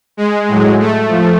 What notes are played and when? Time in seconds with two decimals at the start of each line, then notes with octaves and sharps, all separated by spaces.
0.17 G#3
0.48 A2 F#3
0.79 A3
1.09 F3